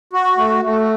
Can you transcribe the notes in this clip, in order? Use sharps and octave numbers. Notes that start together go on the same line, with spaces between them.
F#4
A3
A3